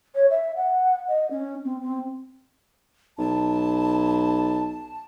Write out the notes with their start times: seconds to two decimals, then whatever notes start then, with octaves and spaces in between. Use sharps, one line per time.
0.15 C#5
0.30 E5
0.56 F#5
1.08 D#5
1.31 C#4
1.65 C4
1.81 C4
3.18 B1 A5